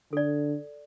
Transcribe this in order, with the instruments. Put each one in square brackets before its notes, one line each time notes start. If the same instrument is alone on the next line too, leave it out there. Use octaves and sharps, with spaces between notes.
[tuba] D3 [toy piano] A4 D5